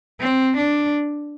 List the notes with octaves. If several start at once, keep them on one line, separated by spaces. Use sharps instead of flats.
C4
D4